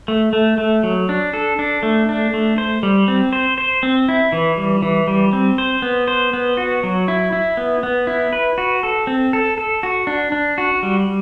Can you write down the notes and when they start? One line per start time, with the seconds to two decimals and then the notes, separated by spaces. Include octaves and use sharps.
0.08 A3
0.33 A3
0.58 A3
0.83 F#3
1.09 D4
1.33 A4
1.59 D4
1.83 A3
2.09 D4
2.34 A3
2.58 C5
2.83 G3
3.08 C4
3.33 C5
3.58 C5
3.83 C4
4.09 E4
4.32 E3
4.57 G3
4.82 E3
5.07 G3
5.33 C4
5.58 C5
5.82 B3
6.08 C5
6.33 B3
6.57 F#4
6.83 F#3
7.08 E4
7.33 E4
7.57 B3
7.83 B3
8.07 E4
8.33 B4
8.58 F#4
8.83 A4
9.07 C4
9.33 A4
9.58 A4
9.83 F#4
10.07 D4
10.32 D4
10.58 F#4
10.83 G3